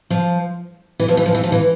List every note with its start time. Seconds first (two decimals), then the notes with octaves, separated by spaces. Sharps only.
0.10 F3
1.00 E3
1.08 F3
1.17 E3
1.26 F3
1.34 E3
1.44 F3
1.52 E3